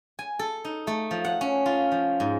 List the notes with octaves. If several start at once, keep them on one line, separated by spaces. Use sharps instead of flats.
G#5
A4
D#4
A3
F3
F#5
C#4
F4
F3
G#2